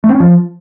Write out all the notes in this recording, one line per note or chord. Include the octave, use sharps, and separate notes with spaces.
A3
C4
C#4
F3